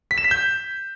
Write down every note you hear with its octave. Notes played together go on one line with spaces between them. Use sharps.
B6
E7
B6
G6